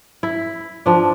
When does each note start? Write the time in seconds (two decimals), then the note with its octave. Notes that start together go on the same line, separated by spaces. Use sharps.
0.23 E4
0.86 F3 D4